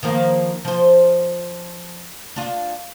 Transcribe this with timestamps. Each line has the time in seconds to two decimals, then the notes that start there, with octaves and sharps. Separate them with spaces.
0.03 D#3 F3 A#3
0.65 F3 C5
2.36 D4 F4